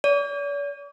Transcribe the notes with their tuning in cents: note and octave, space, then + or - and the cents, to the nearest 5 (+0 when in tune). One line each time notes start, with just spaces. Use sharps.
D5 -45